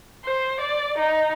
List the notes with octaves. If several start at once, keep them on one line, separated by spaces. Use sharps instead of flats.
C5
D5
D#4